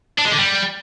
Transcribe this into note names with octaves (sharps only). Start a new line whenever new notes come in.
D4
G#3
D3
G3